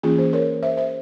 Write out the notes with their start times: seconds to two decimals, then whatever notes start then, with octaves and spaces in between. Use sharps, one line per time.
0.03 E3 A#3 C#4 F4 G#4
0.18 G#4 C5
0.33 A#4 C#5
0.63 C5 E5
0.77 C5 E5